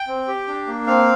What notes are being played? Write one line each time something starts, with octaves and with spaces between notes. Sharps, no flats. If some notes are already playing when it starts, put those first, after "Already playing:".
Already playing: G5
C4
G4
D4
A#3
C4 F5